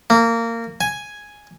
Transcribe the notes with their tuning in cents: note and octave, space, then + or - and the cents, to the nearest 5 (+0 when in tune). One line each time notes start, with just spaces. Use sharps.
A#3 -20
G#5 +0